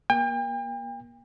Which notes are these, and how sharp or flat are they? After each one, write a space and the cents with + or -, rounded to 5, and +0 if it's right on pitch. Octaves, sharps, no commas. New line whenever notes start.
A#3 +30 G5 +40